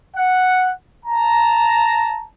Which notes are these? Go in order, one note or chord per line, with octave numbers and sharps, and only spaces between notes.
F#5
A5 A#5